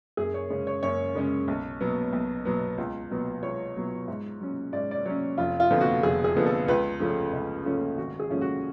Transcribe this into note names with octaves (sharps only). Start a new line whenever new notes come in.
F#2 G#4
C#5
C#3 G#3 C#4
C#5
F#2 C#5
C#3 G#3 C#4
B1
B2 F#3 B3
B1
B2 F#3 B3
C#2
B2 F#3 B3
C#2 C#5
B2 F#3 B3
G#2
F#3 C#4
G#2 D5
D5
F#3 C#4 C#5
F1 F4
F4
F2 D3 F3 B3
F#4
F1 G#4
G#4
F2 D3 F3 B3
A4
C#2 B4
C#3 F3 A3 C#4
C#2
C#3 F3 A3 C#4
G#1 F#4
G#4
G#2 F3 A3 C#4
F#4